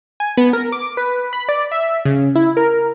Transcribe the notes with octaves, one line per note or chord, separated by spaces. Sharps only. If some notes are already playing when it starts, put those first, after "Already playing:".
G#5
B3
A#4
D6
B4
B5
D5
E5
C#3
E4
A#4